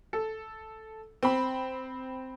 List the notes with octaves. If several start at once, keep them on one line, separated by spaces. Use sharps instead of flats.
A4
C4 B5